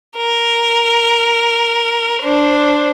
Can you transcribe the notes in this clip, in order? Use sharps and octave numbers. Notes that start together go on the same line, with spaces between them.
A#4
D4 C5